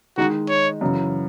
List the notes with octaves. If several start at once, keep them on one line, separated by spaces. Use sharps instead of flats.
D#3 G#3 D#4 F#4
C#5
F#2 C#3 E3